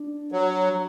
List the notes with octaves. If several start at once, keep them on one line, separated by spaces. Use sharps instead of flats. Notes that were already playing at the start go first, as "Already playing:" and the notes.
Already playing: D4
F#3